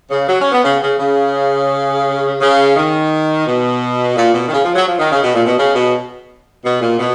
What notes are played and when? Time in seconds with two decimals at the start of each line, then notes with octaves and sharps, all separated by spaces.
0.11 C#3
0.28 F#3
0.41 C#4
0.52 B3
0.64 C#3
0.82 C#3
0.99 C#3
2.41 C#3
2.76 D#3
3.47 B2
4.16 A#2
4.34 B2
4.48 D#3
4.53 C#3
4.64 F3
4.75 F#3
4.88 F3
4.99 D#3
5.11 C#3
5.24 B2
5.35 A#2
5.46 B2
5.58 C#3
5.75 B2
6.65 B2
6.81 A#2
6.99 B2